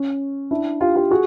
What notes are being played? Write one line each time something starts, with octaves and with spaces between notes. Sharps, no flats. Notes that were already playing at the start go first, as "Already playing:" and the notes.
Already playing: C#4
D4 E4
F4 G4
F4 G4
F#4 G#4